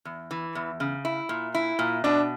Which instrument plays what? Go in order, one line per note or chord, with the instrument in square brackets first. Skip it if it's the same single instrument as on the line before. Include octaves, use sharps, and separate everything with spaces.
[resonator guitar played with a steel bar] E2
E3
E2
C#3
E4
A#2
E4
A#2
[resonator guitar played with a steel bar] B2 [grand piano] D4